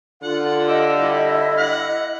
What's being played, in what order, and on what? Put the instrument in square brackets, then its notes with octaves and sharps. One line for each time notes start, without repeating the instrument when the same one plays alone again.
[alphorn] D3 [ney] F4 [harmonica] F#5
[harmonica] G4 E6 [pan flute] D#5
[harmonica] G3 [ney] E4
[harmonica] F#5